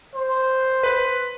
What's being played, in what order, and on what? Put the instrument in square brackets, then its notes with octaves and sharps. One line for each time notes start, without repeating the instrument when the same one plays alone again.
[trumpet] C5
[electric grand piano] B4